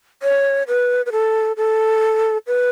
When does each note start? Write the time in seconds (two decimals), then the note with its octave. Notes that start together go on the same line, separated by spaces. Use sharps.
0.23 C#5
0.68 B4
1.06 B4
1.12 A4
1.57 A4
2.47 B4